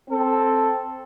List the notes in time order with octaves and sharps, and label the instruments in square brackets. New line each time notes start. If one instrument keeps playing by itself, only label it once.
[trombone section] C4 A4